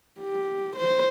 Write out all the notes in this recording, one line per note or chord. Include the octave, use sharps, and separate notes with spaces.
G4
C5